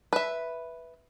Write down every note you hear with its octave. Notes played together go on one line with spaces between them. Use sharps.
B4 E5